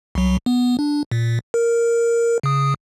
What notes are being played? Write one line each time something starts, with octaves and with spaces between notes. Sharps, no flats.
C2 F#3
B3
D4
A#2
A#4
C#3 D#6